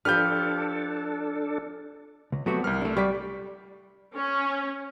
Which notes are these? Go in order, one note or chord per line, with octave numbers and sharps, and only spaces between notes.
F3 D4 G4 A4 B4 F6 G6
C#2
F#3 A3 B3 C4 F#4 G4
C2 G3 A#4 F6
A3 D4
G3 G4 D5 C#6 B6
C#4